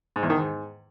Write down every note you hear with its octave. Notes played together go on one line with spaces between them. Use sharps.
G#2
E2
D#3
G#2